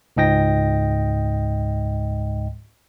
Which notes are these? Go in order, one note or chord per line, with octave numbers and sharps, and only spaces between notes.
C#2 G#2 D#5 G5 A#6